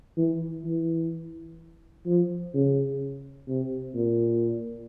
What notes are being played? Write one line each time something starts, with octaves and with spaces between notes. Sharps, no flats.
E3
E3
F3
C#3
C3
A#2